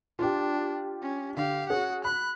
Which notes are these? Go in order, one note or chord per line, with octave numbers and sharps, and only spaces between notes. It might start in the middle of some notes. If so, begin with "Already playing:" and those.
D4 F4 G4
C#4
D3 G4 F5
C#4 F#4 G#4 F#5
B5 F#6